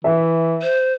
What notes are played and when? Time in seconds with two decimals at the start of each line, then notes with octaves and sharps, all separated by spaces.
0.04 E3 E5
0.62 C5